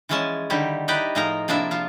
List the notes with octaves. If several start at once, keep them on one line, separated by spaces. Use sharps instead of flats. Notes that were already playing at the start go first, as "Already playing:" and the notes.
E3 F3 G#3 C#4 G#5 A5
D3 D#3 G3 E4 G4
D#4 E4 G4 B4 D5 D#5
A2 F3 D#4 G#4 A#4 A#5
C3 F3 A#3 D4 E4 E5
F3 F4